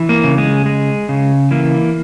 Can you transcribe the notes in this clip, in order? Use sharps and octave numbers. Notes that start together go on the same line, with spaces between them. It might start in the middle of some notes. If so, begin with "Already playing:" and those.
Already playing: E3
A#3
C#3
G#3
G#3
C#3
E3 A#3